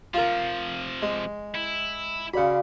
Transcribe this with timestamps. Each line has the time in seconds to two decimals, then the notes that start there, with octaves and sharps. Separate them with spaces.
0.14 C3 F3 F4 A#4
1.02 G#3
1.55 E4
2.34 C#3 F#4 D5 F5 B5